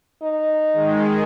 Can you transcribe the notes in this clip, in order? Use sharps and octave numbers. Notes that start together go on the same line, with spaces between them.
D#4
D#3 G#3